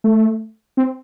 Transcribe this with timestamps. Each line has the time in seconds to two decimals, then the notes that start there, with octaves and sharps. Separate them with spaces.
0.04 A3
0.77 C4